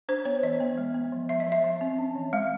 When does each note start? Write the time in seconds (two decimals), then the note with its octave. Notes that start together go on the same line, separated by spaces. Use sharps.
0.09 D4 C5
0.25 B3 C#5
0.43 E3 D#5
0.60 B3
0.78 G#3
0.94 B3
1.12 F3
1.29 F3 E5
1.40 D#5
1.47 F3
1.52 E5
1.64 F3
1.81 C4
1.98 C#4
2.15 E3
2.33 G#3 F5